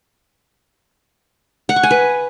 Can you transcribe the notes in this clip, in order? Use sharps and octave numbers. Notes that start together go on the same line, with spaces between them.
F#5
C#6
G#5
B4